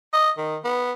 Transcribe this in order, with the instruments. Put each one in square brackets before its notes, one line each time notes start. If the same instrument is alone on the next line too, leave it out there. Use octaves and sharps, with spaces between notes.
[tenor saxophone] D#5
D#3
B3